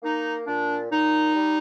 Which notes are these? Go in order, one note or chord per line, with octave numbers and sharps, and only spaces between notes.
A#3 D#4
A#2 D4
A#2 D#4
G3